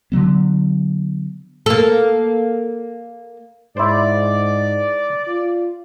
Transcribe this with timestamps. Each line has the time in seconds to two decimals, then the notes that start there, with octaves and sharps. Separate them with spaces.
0.12 D3 E3 F#3 B3
1.66 A#3 A4
3.77 G#2 E4 C5 D5
5.28 F4